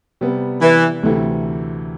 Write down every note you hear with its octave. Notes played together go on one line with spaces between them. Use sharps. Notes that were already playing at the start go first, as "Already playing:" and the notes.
C3 G3 B3
E3
D2 C3 E3 A3 E4